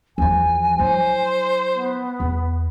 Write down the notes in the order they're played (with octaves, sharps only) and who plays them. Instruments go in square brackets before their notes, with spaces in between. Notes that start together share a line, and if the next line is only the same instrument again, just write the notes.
[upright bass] E2 F3 [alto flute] G#5
[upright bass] F#3 E4 [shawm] C5
[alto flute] B3
[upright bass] E2